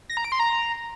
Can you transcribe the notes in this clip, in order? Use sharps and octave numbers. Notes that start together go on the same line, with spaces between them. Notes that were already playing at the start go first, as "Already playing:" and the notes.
A#6
A#5
D7
C6
A#5